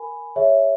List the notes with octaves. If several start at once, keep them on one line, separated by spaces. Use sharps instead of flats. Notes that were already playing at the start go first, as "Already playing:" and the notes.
Already playing: A#4 G#5 B5
G#4 C#5 E5